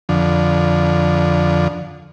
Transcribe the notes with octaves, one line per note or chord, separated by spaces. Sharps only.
F2 D3